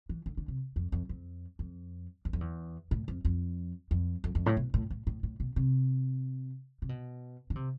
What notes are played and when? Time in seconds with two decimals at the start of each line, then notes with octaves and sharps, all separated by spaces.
0.09 E3
0.26 D3
0.37 D3
0.48 C3
0.76 F2
0.92 F2
1.09 F2
1.59 F2
2.25 E2
2.33 F2
2.41 E2
2.91 A2
3.08 F2
3.25 F2
3.91 F2
4.24 F2
4.35 F2
4.46 A2
4.57 B2
4.74 A2
4.90 A2
5.07 A2
5.23 A2
5.40 B2
5.56 C3
6.82 C3
6.89 B2
7.50 D3
7.55 C3